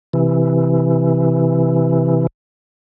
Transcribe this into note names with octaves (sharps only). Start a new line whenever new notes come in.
C3 E3